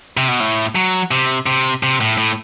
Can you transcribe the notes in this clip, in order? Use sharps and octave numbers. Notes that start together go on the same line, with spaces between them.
C3
B2
A2
F#3
C3
C3
C3
A2
A2